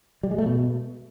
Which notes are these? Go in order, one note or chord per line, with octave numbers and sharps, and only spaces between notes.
G3
G#3
A3
B2